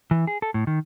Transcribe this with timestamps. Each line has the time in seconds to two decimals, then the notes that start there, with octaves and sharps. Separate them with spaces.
0.11 E3
0.27 G#4
0.42 A4
0.54 A2
0.67 D#3